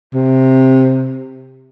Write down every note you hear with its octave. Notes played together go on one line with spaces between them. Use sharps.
C3